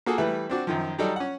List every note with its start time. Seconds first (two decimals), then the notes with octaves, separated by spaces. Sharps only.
0.06 A#3 F#4 G#4 A4
0.18 E3 G3 A3 B4 E5
0.50 C4 D4 F#4
0.67 F#2 D#3 F3
0.98 F#3 G3 D#4 A4 D5
1.16 C#4 F#5